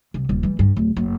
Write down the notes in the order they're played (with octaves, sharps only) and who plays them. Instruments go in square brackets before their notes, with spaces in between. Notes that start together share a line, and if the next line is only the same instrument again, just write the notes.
[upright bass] C2
D#1 G3
E3 G3
G2
D1
F#1